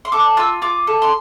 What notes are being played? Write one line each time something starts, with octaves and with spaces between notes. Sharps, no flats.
C6
A4 D6
F4 E6
F4 D6
A4
C6